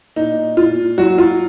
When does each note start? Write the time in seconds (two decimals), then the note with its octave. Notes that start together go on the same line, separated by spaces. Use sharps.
0.16 A#2 D#4
0.57 A#2 F4
0.98 F#3 F#4
1.18 F4